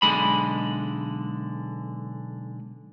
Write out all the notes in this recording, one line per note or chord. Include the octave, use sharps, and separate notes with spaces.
B1 D3 G#3 B5